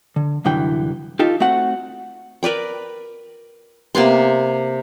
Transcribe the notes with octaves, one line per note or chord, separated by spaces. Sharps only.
D3
C2 F#2 D3 E3 G5
D#4 F4 G4 A4
A3 C4 F#4 F#5
A#4 B4 D5 G5
C3 A#3 B3 C6